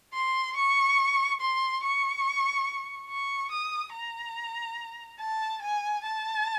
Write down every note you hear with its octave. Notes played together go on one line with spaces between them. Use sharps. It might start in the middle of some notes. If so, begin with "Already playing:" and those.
C6
C#6
C6
C#6
C#6
D#6
A#5
A5
G#5
A5